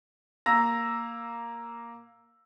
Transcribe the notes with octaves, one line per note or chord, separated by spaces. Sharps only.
A#3 A#5 E6 A#6